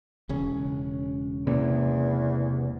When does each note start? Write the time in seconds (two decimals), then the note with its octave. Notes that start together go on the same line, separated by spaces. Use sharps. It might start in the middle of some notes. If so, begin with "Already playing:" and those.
0.29 E1 C#3 C#4
1.47 E2 C3 A#3